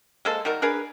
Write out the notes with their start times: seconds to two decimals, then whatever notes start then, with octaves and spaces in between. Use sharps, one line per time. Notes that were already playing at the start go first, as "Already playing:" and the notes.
0.25 G#3 A#3 A4 C5
0.45 D#3 G3 F#4 A#4
0.62 D4 G#4 A#4 B4